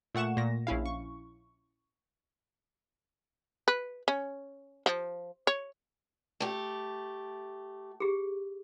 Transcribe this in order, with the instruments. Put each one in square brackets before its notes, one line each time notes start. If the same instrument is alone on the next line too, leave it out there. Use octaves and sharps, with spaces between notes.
[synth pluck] A#2 A3 F#5 C#6 E7
A#2 A#6
A#1 C#4 E4 F5
C#6
[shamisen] B4
C#4
F3
C#5
[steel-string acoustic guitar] A3 G4
[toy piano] G4 G#4